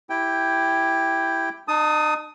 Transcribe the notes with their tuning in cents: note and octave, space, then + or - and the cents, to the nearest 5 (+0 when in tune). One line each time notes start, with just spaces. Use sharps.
E4 +0 G4 +0 G5 +0
D#4 -40 A5 +0 D#6 +10